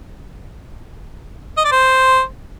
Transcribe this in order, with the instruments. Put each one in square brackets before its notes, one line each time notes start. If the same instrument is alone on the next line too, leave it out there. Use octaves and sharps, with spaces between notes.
[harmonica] D#5
D5
C5